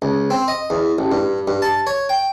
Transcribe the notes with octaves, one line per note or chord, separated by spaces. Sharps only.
C#2
C4
D#5
E2
A1
G2
G2
A5
C#5
G5